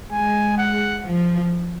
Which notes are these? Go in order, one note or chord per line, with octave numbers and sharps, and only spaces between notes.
G#3 G#5
F#5
F3